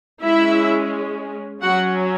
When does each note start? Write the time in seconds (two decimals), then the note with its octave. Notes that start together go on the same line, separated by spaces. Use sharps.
0.23 G#3 C#4 E4 E5
1.62 F#3 C#4 F#4 F#5